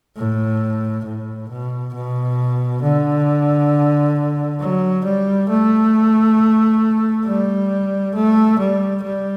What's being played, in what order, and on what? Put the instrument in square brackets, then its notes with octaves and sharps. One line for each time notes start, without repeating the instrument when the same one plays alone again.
[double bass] A2
A2
B2
B2
D3
F#3
G3
A3
G3
A3
G3
G3